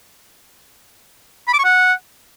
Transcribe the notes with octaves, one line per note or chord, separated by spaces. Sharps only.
B5
D6
C#6
F#5